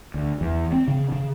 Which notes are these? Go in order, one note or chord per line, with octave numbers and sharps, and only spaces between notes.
D2
E2
C4
C#3
C#3